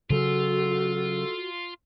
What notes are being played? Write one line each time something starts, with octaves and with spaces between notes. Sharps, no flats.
C#3 F#3 F4 F#4 A4